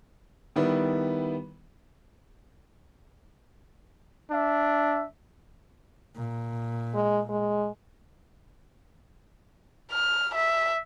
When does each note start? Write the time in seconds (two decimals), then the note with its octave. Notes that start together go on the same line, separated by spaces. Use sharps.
0.56 D#3 G3 B3 E4
4.31 D4 E5
6.16 A#2
6.94 G#3
7.29 G#3
9.92 F6
10.35 E5